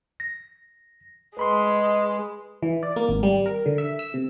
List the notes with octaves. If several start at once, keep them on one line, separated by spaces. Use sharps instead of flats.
A#6
G#3 B4 B5 C6
E3
D5
A#3
G#1
G3
A#4
D3
E5
E6
C3